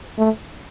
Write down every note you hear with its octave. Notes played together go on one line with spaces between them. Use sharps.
A3